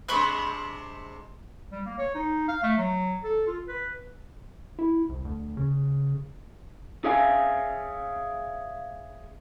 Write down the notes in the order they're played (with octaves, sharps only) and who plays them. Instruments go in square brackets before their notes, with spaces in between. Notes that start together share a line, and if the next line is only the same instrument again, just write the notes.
[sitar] C3 G#3 D4 [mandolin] B5 C#6 F#6
[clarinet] G3
A#3
C#5
D#4
F5
A3
F#3
A4
F4
B4
[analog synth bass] E4
C2
D2
C#3
[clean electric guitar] G#4 C#5 E5 F5 G#5